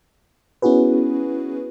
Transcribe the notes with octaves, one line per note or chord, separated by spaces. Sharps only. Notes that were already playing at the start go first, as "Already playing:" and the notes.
B3 C#4 E4 F#4 G#4 B4